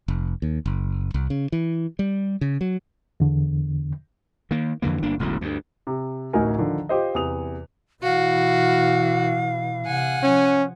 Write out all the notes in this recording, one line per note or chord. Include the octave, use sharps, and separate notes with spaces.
F1
D#2
F#1
C2
C#3
E3
G3
C#3
F#3
E2 D3
D#3 A#3
F2 D3 E3 A#3
G1 A#3 D4
E1 A1 D3 F#3
D2 G2
C3
A1 D2 D#4 F#4 A#4 G#5
D3 D#3 F3
F4 G4 C5 D#5
E2 C3 D#6 F7
B2 E3 F#4 F5
C3 F#5 G#5
F3 C#4